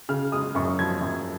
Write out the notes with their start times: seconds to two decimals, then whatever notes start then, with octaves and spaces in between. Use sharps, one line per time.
0.09 C#3 F6
0.32 G#3 D#6
0.55 F#2 C#6
0.79 F3 G#6
1.01 F#2